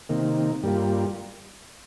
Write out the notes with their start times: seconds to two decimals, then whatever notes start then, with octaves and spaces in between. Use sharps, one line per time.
0.09 C3 D#3 A#3
0.63 G2 G3 A#3 F4